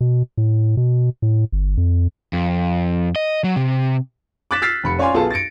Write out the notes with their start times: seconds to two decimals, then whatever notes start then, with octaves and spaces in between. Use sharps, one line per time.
0.01 B2
0.38 A2
0.77 B2
1.22 A2
1.52 G1
1.77 F2
2.33 F2
3.16 D#5
3.44 F#3
3.56 C3
4.51 D6 F#6 A6 B6 E7
4.62 E6 F6 A6 B6 C7
4.84 F1 B5 C#7
4.99 C#4 C#5 D5 F5 G#5 C6
5.14 B1 F4 G#4 A4 B4 A5
5.31 A6 A#6 C#7 D7